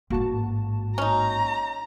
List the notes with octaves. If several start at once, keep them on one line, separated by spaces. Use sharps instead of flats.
A1 G#2 A#3 F#4 A5
C#4 D#4 A#5